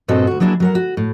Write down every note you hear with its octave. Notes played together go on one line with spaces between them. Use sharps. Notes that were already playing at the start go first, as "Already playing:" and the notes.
G2 A#2 C4 F#4 A4 D#5
D2 F#4
F#3 A#3 D4 E4 G#4
F#3 A#4 F#5
F#4
A2